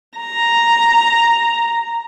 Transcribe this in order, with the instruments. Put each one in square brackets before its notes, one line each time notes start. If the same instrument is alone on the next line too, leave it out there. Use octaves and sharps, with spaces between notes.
[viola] A#5